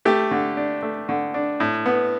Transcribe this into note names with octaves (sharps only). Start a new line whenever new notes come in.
A3 G4
D3
D4
A3
D3
D4
A2
B3